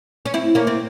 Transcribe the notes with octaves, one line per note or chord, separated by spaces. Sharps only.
C#4
C4 E4
A#3 C#4
C4